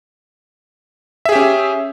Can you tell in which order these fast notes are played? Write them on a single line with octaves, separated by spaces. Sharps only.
E5 G#4 G4 C#4